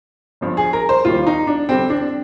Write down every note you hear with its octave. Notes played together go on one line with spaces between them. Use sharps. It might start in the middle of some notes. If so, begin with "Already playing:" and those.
G1 G2 F3
G#4
A#4
C5
D#2 D#3 G3 F4
D#4
D4
F2 D3 G3 C4
D4